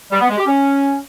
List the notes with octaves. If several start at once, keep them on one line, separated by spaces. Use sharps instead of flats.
G3
B3
G#3
G4
C#4